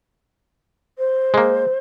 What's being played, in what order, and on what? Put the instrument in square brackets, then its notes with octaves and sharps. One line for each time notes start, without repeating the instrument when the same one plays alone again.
[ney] C5
[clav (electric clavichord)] G#3 A#3